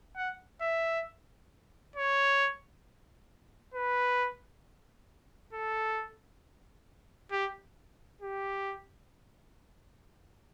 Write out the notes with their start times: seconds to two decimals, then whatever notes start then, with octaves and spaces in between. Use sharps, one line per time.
0.17 F#5
0.62 E5
1.96 C#5
3.74 B4
5.53 A4
7.32 G4
8.21 G4